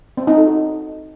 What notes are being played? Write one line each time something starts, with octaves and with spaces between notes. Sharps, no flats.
C4
D#4
A4
F#4